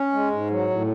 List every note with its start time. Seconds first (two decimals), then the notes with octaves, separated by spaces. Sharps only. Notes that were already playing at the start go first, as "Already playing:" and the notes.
Already playing: C#4
0.12 G#3
0.31 G#2
0.50 F#3
0.70 A2